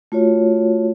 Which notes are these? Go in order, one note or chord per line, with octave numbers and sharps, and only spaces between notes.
A3 F4 F#4 C#5